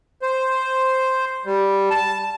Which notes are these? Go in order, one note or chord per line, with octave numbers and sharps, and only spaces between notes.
C5
G3
A5